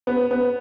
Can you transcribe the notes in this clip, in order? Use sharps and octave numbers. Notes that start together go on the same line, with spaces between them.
B3
B3